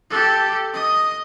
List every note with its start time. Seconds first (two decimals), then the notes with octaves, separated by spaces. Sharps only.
0.10 G4 A4
0.73 D#5 D#6